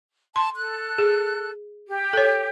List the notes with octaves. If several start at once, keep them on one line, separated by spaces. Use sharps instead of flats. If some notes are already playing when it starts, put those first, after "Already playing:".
A5 C6
A4 F#6
G#4
G4
A4 C#5